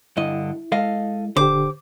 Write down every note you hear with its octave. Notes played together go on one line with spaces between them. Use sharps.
G2 D3 E4 D#5
G#3 A4 D#5 F5
D#1 D3 G4 C5 D6